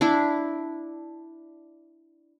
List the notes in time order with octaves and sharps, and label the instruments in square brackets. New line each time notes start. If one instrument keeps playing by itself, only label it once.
[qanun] D4 E4